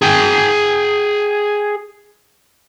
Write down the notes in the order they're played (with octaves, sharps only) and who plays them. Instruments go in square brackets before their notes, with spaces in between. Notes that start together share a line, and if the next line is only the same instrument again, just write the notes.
[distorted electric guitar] G#4 G5